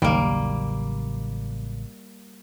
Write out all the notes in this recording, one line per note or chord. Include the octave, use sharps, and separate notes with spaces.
A1 D#2 C#3 F#3 G3 A#3